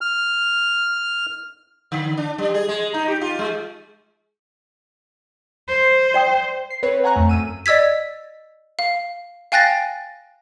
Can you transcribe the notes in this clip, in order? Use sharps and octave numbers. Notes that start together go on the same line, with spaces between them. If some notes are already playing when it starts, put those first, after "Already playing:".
F6
D3
D4
G3
G#4
G#3
D#4
G4
F4
G#3
C5
D5 G5 D#6
C7
C4 B4 C#5
F#5 G#5 A#5 C#6 F#6
F2 A3
F#2 E6 D#7
D5 D#5 E6 G#6 B6
F5
F5 G5 G#5 F#6 A6 A#6